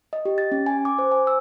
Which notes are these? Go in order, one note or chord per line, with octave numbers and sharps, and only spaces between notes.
D#5
G4
A6
C#4
G#5
D6
C5
G#5
E6